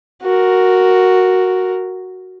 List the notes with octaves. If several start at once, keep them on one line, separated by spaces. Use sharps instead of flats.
F#4 A#4